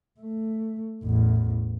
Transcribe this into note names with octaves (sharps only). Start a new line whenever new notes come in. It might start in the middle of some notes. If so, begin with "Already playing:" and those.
A3
A1 E2